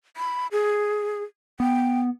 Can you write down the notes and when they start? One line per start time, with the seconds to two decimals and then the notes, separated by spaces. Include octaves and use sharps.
0.17 B5
0.52 G#4
1.60 B3 G5